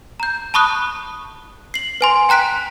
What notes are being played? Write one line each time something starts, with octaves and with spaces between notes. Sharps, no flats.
A#5 G6
A5 B5 C#6 D#6 F#6
C7 F#7
B4 G#5 C6
G5 A#5 F#6 B6 D7